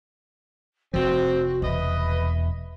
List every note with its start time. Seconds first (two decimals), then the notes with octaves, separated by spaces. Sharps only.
0.94 F1 F3 C4 F#4
1.62 E1 E2 B4 D#5 E5